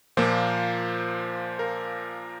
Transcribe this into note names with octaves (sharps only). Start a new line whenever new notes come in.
A#2 F3 A#3 C5
A#4